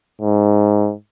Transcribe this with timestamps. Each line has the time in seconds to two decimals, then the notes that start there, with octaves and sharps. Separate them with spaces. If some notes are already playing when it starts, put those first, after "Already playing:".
0.22 G#2